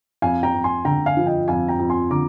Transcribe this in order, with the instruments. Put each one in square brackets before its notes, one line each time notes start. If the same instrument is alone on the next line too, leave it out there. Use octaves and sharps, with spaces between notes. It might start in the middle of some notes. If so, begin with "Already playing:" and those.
[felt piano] F2 [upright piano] F5 G#5
[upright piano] G5 A#5
[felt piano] F2
[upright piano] G#5 C6
[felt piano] D3 [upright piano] G5 A#5
[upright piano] F5 G#5
[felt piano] F3
[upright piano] D#5 G5
[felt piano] F2 [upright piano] F5 G#5
[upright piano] G5 A#5
[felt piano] F2
[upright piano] G#5 C6
[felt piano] D3 [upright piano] A#5 D6